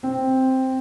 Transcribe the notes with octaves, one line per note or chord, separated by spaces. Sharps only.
C4